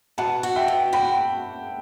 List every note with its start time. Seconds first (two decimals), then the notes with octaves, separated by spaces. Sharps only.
0.18 B2 F#5 A5
0.43 F#4
0.56 E5 G5
0.68 B2
0.93 F#4 G5 B5